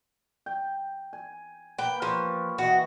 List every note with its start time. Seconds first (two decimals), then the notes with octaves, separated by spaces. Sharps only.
0.46 G5
1.13 G#5
1.79 A#3 B4 G5
2.02 F3 G4 C#5
2.58 E3 F#4 D#5